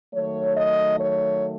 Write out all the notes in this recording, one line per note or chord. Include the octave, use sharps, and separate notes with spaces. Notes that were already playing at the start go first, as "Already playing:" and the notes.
D#3 F#3 A3 C#5
D#5
C#5